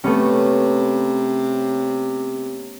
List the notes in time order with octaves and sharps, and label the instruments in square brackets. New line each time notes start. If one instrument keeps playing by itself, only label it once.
[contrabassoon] C3 [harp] A3 B3 C#4